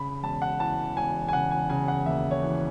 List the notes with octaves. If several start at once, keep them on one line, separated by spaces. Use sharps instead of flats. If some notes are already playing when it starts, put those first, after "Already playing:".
Already playing: C#3 B5
E1 A5
F#5
E3 A5
E1 G#5
G#5
C#3 F#5
G#5
C#3 G#5
F#5
D#2 E5
C#5
E3